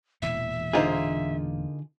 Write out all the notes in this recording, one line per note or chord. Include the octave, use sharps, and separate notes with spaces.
E1 A#2 E3 E5
D3 A#3 D#4 F4 G#4 C5